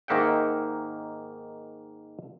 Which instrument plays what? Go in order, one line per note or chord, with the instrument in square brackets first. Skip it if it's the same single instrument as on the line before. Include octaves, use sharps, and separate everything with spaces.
[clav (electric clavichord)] G#2 D#3 A#3 E5 F#5 G5